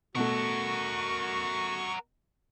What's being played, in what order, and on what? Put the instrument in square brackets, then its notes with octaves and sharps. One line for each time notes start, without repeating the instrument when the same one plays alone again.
[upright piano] B2 A3 [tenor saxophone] F#4 [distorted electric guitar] A#4 F#5 [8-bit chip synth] C#6